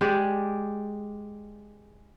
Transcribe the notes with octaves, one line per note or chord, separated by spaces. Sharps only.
G#3 G4 G#4 D5